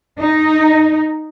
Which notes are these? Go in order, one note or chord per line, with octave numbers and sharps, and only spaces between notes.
D#4